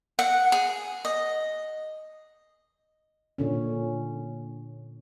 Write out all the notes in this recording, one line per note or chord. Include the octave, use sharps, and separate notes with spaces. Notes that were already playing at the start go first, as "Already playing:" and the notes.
F#5
G#4
D#5
A#2 D3 C#4